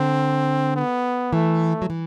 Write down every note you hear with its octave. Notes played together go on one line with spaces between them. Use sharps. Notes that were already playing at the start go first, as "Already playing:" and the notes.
Already playing: D3 C4
B3
E3 A3
F#3
E3